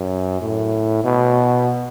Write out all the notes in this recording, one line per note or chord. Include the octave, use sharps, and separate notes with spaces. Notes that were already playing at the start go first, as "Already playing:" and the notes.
Already playing: F#2
A2
B2